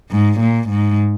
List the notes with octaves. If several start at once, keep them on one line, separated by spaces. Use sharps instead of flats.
G#2
A#2
G#2